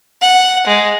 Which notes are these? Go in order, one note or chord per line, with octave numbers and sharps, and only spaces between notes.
F#5
G#3